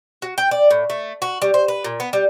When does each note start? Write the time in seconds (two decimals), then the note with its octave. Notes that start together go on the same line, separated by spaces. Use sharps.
0.22 F#4
0.38 G5
0.51 D5
0.71 A2
0.90 A3
1.22 F#4
1.42 G3
1.54 C5
1.68 B4
1.84 A#2
2.00 B3
2.13 G3